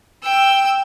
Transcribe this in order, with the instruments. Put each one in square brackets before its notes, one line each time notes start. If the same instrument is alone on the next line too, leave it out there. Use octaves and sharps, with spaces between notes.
[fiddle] G5 E6